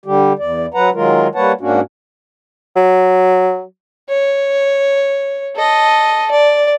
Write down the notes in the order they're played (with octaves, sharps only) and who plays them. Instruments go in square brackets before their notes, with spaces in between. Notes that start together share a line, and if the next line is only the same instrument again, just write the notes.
[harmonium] D3 G3 G4
E2 D5
F#3 B4 F#5 A#5
D#3 F#3 G#3 F4 A#4
G3 A#3 B4 C#5 F#5 A5
G#2 A#3 C#4 D4 F#4
[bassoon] F#3
[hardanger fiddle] C#5
A4 D#5
D5